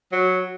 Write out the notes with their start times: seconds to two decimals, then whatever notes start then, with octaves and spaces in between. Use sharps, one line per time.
0.10 F#3